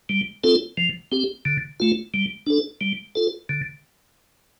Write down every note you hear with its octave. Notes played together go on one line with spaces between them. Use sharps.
G3
C4 F4 A4
F3
C4 G4
D3
A3 F4
G3
D4 A4
G3
F4 A4
D3